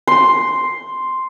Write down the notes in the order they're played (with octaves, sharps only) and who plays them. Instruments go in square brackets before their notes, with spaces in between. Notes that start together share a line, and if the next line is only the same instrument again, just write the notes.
[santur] C6